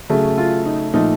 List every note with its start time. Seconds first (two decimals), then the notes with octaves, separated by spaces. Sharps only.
0.10 C#3 F#3 A3
0.38 F4
0.65 D#4
0.94 A#2 F3 A3 D#4